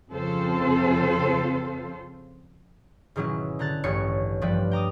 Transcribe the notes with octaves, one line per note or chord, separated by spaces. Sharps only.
F2 C#3 C4 F4 A4 C5
G#2 B2 D#3 F#3 C#4 E4
D3 A#5 F#6 A6
A1 G2 E3 B3 C#5 C#7
G2 F3 G3 B4 D5
G5 A#5 D6 D#6